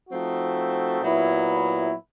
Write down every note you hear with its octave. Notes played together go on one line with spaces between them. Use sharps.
F3 A3 C4 D#4 F#4
A#2 F#3 B3 E4